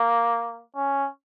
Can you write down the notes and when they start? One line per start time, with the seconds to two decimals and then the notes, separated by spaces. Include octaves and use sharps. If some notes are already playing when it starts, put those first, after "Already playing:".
Already playing: A#3
0.76 C#4